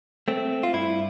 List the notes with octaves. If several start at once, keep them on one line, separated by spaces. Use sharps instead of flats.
A3 C4
F4
G2 E4